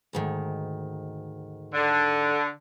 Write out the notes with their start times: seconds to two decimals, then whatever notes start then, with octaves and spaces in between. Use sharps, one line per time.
0.13 D2 G#2 D#3
1.73 D3